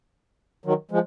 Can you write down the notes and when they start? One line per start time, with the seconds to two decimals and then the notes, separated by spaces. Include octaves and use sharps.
0.65 D#3 F#3
0.91 F3 G#3